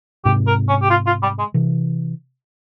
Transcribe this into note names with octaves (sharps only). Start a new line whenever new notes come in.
G#2 C3 G4
A#4
C#4
G4
F4
F4
G3
G#3
C3 E3